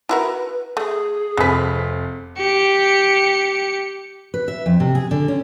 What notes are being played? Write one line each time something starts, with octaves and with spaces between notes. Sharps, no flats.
E4 F#4 A#4 B4
A3 G#4
F1 F2 G#3 B4 B6
G4 C#7
B4
E5
F2
C3
G#4
D3
C#4